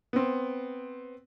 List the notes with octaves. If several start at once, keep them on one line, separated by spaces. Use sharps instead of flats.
B3 C4